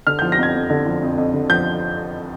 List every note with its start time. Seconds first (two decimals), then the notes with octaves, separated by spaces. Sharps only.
0.07 D3 F6
0.19 G6
0.22 F3
0.32 A#6
0.39 F2 G#6
0.54 F2
0.70 D3
0.86 F3
1.03 F2
1.18 F2
1.33 D3
1.49 F3 G6